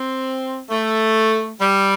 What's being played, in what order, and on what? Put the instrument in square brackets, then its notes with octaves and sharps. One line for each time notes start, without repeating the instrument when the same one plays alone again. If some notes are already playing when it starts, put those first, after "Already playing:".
Already playing: [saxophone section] C4
A3
G3